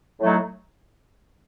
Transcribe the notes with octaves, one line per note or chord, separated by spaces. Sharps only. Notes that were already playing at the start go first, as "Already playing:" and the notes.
A2 F#3 A3 D#4